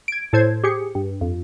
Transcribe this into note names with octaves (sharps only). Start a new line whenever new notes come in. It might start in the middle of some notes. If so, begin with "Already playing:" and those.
G#6 D7
A2 A4 C5 G#6
G4 G#4 C#7
G2
F2